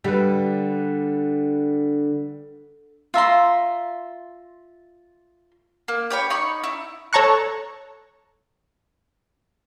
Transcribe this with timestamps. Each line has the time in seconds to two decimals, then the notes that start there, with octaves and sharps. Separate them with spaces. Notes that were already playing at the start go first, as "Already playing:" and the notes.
0.04 D3 G3 B4
3.14 F4 E5 A#5 C6
5.88 A#3
6.10 G4 C#5 G5 B5
6.30 D#4 C#5 B5 C#6
6.64 E4
7.13 A4 C#5 A5 A#5 C#6 F#6